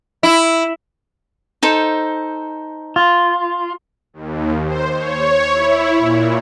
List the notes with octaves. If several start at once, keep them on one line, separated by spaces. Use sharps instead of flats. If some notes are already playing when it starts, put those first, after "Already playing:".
E4
D#4 A4 C5
F4
D#2
C5
C#5
E4
A#2